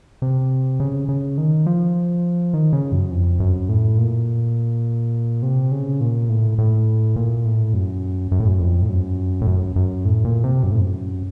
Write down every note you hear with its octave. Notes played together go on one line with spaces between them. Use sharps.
C3
C#3
C#3
D#3
F3
D#3
C#3
F#2
F2
F#2
A2
A#2
C3
C#3
A#2
A2
A2
A#2
A2
F#2
F#2
A2
F#2
F2
A2
F#2
A2
F#2
F#2
A2
A#2
C3
F#2
A2
F#2